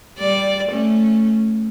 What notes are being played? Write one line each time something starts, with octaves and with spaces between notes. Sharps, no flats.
G3 D5
A3 C#4